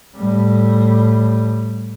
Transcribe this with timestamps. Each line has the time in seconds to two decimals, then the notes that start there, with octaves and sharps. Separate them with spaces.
0.16 A2 G3